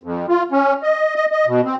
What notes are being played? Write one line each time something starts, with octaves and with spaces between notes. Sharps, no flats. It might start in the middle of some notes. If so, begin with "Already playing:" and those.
F2
F4
C#4
D#5
D#5
D#5
B2
C4